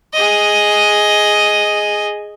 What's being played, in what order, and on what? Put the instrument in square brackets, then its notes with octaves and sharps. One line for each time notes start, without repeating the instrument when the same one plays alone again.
[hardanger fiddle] G#4 D#5